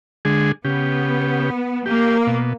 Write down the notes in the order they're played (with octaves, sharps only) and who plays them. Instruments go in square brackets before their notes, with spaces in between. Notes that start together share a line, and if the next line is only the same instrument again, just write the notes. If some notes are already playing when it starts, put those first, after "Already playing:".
[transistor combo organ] D3 G#3 G#4
[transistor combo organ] C#3 G4 [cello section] B3
[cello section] A#3 [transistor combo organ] G4
[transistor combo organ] B2